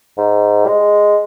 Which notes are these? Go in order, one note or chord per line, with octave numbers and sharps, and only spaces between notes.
G#2
G#3